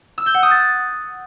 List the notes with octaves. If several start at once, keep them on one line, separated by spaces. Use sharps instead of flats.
E6
G6
F#5
D#6
A6